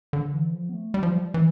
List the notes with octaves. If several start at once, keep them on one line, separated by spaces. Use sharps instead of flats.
D3
E3
F3
B3
A3
G3
F3
G3
E3